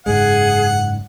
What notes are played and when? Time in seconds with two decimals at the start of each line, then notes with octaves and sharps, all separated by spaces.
0.06 F#1 G#2 G#3 G#4 F#5